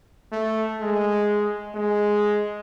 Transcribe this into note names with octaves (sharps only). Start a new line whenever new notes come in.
A3
G#3
G#3